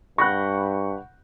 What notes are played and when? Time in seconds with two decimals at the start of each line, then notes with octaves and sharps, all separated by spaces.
0.18 G2 F#5 B5 C#6 F#6 G6 A#6